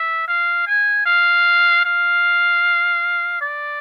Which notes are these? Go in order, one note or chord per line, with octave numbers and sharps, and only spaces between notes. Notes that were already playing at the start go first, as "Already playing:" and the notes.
Already playing: E5
F5
G#5
F5
F5
D5